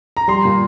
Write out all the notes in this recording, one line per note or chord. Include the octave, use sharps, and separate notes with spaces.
A#5
G3 C6
A#2